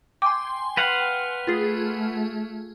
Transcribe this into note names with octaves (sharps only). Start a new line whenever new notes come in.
G5 G#5 C6 D6
B4 F5 F#5
A3 F4 G#4